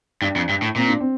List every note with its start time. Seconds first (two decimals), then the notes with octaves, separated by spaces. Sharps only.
0.22 G2 D4
0.36 F2
0.49 G2
0.62 A2
0.76 A#2 C4
0.88 D4
1.00 C4